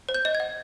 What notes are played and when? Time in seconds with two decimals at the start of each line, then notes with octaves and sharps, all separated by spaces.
0.09 C5
0.15 G6
0.25 D#5
0.35 G#6
0.40 F#5